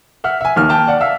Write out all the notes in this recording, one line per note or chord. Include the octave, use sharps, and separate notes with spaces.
E5 F#5 F6
E5 G#5
D#2 A#3 F6
G5 A5 F6
D5 F#5
E5 F5 E6 F6